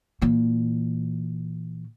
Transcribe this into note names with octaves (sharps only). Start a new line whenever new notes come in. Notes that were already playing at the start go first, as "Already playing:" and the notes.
A#2 E3